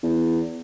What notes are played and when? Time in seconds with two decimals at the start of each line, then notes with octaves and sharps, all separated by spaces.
0.03 E2